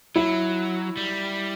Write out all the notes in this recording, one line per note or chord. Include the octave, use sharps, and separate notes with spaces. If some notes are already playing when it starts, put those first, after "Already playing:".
F#3 E4
G3